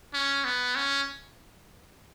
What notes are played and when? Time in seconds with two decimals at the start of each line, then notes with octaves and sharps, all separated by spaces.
0.13 C#4
0.45 B3
0.75 C#4